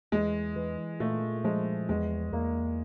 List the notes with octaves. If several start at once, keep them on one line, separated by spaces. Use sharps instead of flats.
E2 G#3
E3
A#2 A3
F3 G#3
E2 G#3
E2 A#3